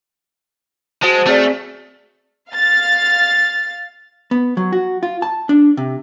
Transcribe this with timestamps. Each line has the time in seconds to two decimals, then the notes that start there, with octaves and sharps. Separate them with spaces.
1.03 G#3 F#4 C5 A5
1.27 A3 C4 G#4 D5
2.50 F5 A6
4.31 B3
4.57 F#3
4.72 F#4
5.03 F4
5.22 A5
5.49 D4
5.77 C3